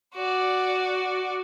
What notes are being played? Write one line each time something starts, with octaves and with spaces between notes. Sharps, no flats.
F#4 D5